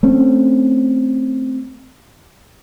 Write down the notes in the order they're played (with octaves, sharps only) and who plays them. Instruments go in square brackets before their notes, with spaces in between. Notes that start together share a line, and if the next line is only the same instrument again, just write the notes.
[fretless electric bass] A3 C4 C#4